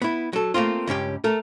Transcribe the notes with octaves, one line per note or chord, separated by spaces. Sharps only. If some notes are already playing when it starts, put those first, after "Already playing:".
B3 E4
F#3 A4
A3 A#3 C4 F4
C#2 G2 C#4 G4
A3 A4 A#4